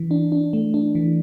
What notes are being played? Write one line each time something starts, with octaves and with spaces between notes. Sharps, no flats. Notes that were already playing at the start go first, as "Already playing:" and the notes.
Already playing: E3
D4
D4
A3
D4
E3